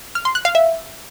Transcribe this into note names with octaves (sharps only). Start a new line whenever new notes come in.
F6
C6
F#6
F5
E5